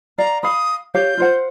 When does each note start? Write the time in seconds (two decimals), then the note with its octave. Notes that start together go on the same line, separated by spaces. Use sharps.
0.18 D5 F5 A#5
0.43 F5 B5 D#6
0.95 G4 C#5 F5 G6
1.18 F4 C5 F#5